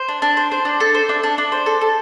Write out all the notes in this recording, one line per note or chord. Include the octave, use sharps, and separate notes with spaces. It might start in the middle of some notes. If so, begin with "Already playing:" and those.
Already playing: C5
D4
D4
C5
C5
D4
A4
C5
D4
D4
D4
C5
A4
A4